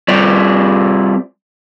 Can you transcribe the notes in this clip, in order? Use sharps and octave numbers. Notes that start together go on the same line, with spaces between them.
G3 C4 F4 D5